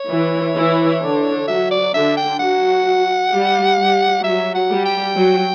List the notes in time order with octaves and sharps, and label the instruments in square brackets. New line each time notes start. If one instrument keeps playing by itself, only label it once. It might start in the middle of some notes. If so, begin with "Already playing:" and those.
Already playing: [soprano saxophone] C#5
[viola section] E3 E4
E3 E4
D3 D4
[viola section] F#3 F#4 [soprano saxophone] E5
[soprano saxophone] D5
[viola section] D3 D4 [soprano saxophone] E5
[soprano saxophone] G5
[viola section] F#3 F#4 [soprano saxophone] F#5
[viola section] G3 G4
G3 G4
[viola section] F#3 F#4 [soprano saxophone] E5
[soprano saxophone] F#5
[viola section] G3 G4
[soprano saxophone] G5
[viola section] F#3 F#4